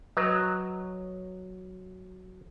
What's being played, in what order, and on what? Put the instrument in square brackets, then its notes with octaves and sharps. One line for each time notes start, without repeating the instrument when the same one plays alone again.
[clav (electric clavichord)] F#3 [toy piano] B4 D#5 D#6